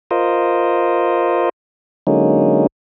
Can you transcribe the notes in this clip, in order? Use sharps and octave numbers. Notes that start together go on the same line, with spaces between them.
F4 A#4 C5 D#5
D3 F#3 G#3 A#3 C#4 D#4